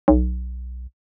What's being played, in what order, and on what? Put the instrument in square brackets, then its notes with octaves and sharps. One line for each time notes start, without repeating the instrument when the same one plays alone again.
[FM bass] B1